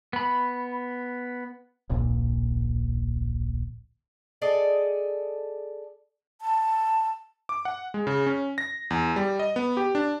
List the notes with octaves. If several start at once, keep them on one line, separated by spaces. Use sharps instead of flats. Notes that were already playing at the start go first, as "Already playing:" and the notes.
B3 B5
D1 A#1 A#2
G#4 A4 D5 D#5
A5
D6
F#5
G#3
C#3
C#4
A#6
E2
G3
D#5
B3
G4
D4